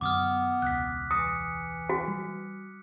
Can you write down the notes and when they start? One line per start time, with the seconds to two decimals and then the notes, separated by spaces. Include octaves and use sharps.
0.01 F#2 D3 B3 D6 D#6 F6
0.62 E1 C#2 F#6 B6
1.11 E3 D#6 C#7
1.90 F#4
2.08 G3